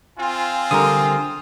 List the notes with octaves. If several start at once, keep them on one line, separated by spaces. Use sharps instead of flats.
C4 F4 G#5
D3 G3 A#4 D#6